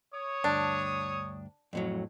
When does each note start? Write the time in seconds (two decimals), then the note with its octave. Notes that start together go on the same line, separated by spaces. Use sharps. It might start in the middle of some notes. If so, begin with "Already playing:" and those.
0.14 C#5 D#6
0.44 D2 G2 D4
1.73 F2 A2 F#3